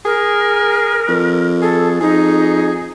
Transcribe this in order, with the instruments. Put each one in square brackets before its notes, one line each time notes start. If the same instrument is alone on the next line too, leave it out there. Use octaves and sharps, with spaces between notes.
[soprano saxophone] G#4 [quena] A#4
[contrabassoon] F2
[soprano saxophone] G#4 [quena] A4
[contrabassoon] F2 [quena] D#4 [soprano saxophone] G#4